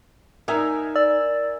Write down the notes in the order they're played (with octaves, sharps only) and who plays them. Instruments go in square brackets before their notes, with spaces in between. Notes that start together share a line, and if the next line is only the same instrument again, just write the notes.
[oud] D#4 [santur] A#4 E5 G#5
[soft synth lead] D5 [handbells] E6